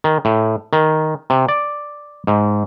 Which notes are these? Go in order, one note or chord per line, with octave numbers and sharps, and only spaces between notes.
D#3
A2
D#3
C3
D5
G#2